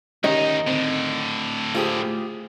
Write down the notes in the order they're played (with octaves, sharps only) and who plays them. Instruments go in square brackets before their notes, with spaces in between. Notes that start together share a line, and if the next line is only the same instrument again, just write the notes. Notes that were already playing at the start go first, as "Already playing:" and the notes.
[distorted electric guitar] D2 D#4 [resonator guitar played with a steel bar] D#3 [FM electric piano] C#4 G4 [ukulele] D#5
[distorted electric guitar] A2 D3 [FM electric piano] C4
[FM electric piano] A3 C5 G5 [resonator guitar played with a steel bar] F4 G4 G#4